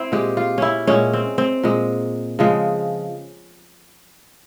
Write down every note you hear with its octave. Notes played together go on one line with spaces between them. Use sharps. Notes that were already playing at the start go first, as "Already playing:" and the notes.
Already playing: C4 E4
A#2 G#3 G4
F4
C#4 E4
A#2 G#3 C#4
C4
C4
A#2 G#3
C#3 F3 G#3